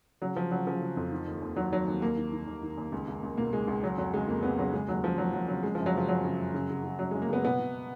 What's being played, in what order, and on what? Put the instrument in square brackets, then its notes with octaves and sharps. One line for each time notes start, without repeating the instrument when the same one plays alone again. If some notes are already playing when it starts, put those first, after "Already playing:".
[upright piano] C#3 F#3
C#3 F3
C#3 F#3
C#3 F3
C#3
F2
D#3
D#2
D#2
D#3 F#3
D#3 F#3
D#2
D#2 A#3
D#3
D#3
D#2
D#3
D#2
C#2
C#2
C#2
B2 A#3
C#2 G#3
C#2
C#3 F#3
F2 F#3
C#3 G#3
F2 A#3
F2 B3
C#3 F#3
C#3 G#3
D#2 F#3
C#3 F3
D#2 F#3
D#2 F#3
C#3 F#3
C#3 G#3
F#2 F3
F#3
C#3 F3
F#2 F#3
C#3
F#2
C#3
C#3
C#3
F#2 F#3
C#3 G#3
A#3
C#3 B3
B2 B3
B2